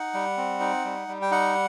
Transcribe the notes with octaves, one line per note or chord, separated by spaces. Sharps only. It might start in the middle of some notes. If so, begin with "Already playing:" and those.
Already playing: D#4 F#5
G3
C4
D#4
G3
G3
G5
D#4 F#5